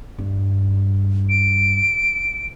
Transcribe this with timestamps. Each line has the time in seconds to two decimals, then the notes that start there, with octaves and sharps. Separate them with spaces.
0.18 G2
1.29 D7